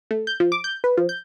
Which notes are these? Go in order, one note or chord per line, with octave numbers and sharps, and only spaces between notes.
A3
G6
F3
D6
G6
B4
F3
G6